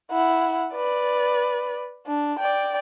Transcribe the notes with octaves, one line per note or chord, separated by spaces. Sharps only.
E4 F#5
B4 D5
D4
D5 G5